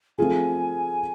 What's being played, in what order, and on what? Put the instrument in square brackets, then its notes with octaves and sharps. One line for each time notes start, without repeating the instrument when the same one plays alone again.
[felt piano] F3 A3 C4 F4 G#4 [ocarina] G#5